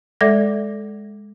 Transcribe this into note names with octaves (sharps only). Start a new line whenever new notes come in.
G#3 A4 D5 E5 D6 A#6